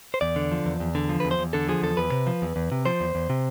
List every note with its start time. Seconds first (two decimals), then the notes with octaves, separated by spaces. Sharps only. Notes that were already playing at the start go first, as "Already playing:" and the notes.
0.14 C5
0.21 E2 D5
0.36 D3
0.52 F3
0.66 E2
0.80 E2
0.95 D3
1.09 F3
1.20 E2 B4
1.31 C5
1.39 E2
1.53 D3 A4
1.68 F3 G#4
1.83 E2 A4
1.97 E2 B4
2.12 C3
2.27 F3
2.42 E2
2.56 E2
2.72 C3
2.86 F3 C5
3.01 E2
3.15 E2
3.30 C3